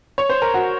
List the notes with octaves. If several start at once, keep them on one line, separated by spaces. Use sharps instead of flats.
C#5
C5
A#4
F#4